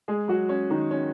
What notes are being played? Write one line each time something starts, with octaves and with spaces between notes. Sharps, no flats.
G#3 G#4
F#3 F#4
C#4
D#3 D#4
C#4